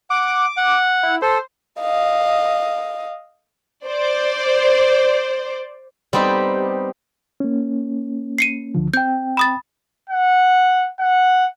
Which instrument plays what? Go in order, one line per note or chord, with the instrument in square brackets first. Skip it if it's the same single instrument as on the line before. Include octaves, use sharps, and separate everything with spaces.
[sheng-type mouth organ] F#5 [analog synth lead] D6
[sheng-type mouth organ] F#5
[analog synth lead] E4
[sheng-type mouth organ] A4 [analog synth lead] C5
[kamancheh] D#5 F5
[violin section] C5 D5
[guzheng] G3 B3 C4 D#4 G4
[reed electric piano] A#3 C#4
[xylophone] C7 C#7 D#7
[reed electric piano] C#2 D3 F3
[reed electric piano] C4 G5 [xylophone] G6
[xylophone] B5 D#6 A6
[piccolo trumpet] F#5
F#5